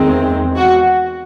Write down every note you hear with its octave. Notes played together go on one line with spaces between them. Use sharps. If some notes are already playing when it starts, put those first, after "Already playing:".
Already playing: E2 D#3 G#3 C4
F#4